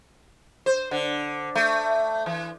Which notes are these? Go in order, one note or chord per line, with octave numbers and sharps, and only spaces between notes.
C5
D3
A3
E3